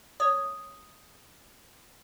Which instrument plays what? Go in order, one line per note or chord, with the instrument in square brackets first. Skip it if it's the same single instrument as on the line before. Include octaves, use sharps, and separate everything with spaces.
[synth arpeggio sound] C#5 [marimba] D#6